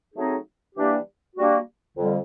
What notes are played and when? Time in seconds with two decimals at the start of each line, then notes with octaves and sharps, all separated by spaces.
0.15 F#3 A3 C4 D#4 G#4
0.75 E3 G3 A#3 D4 G4
1.35 G3 A#3 D4 F#4
1.96 F2 D3 G3